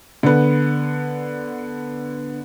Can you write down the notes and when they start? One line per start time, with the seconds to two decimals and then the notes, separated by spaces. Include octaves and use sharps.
0.23 D3 B3